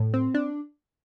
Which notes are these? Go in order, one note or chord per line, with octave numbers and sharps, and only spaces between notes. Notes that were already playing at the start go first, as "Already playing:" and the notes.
Already playing: A2
C4
D4